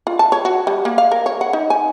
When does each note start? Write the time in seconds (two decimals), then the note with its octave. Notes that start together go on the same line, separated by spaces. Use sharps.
0.07 F4
0.19 A5
0.32 C#5
0.45 F#4
0.67 G3
0.85 A#3
0.98 F5
1.12 A#4
1.26 C#5
1.41 F#5
1.53 D#4
1.70 G#5